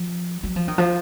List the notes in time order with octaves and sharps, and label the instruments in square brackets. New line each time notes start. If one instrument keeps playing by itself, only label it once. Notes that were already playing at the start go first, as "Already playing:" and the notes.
Already playing: [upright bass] F3
F#3
F3
D#3
F3